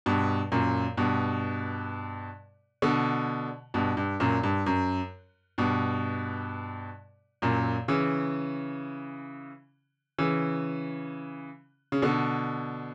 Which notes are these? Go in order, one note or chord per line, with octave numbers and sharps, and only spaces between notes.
G2 B2
F#2 A#2
G2 B2
B2 D3
G2 B2
G2
F#2 A#2
G2
F#2
G2 B2
F#2 A#2
C#3 E3
C#3 E3
C#3
B2 D3